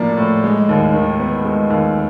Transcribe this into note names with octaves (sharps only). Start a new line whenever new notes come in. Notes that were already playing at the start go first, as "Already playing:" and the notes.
Already playing: A2 F3 A#3 D4
A2
G#3
D#2
D#3
B3
G#3
D#2